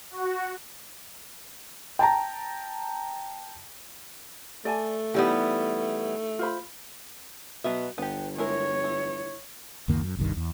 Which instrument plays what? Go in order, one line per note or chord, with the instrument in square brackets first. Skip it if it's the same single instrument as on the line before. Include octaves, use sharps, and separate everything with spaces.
[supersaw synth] F#4
[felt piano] G5 A5 A#5
[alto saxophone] A3 [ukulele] D5 G#5 A5
[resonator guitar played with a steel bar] E3 G3 B3 [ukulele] D#4 E4 G4
[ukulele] F4 C5 B5
[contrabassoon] B2 [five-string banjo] F#3 B3 E5
[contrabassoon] G1 [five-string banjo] B3 G4
[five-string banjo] G#3 E4 A#4 [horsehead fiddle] C#5
[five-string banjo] E4
[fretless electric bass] C#2 F#2 D#3 A#3
F#2
F#1 C2 G2 D#3
E2